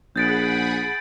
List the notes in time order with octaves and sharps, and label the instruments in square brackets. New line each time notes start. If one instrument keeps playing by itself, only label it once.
[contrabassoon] A#1 [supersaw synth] G#4 F#5 B5 [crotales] G6 A6 D7